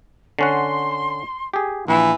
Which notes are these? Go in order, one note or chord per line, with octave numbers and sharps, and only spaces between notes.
D3 C#4 F#5 C6
G4 G#4
A#1 E3